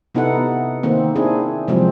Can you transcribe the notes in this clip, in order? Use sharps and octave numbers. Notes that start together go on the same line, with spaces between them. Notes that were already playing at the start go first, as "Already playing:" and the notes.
C3 B3 D#4 E4 A4 F#5
D#3 A#3 C4
C4 D4 E4 G#4
C3 F3 F#3 G#3 C4